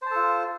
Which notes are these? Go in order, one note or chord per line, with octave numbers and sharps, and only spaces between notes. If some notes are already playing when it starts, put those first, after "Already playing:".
F4 A4 C5 A5